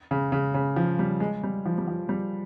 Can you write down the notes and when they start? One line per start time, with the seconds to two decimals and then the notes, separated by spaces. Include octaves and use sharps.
0.11 C#3
0.32 C#3
0.54 C#3
0.76 F3
0.99 G3
1.20 G#3
1.43 G3
1.66 F3
1.78 G3
1.88 F3
2.09 G3